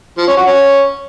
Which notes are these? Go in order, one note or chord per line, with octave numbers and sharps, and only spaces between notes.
F3
C#4
F#4
C#4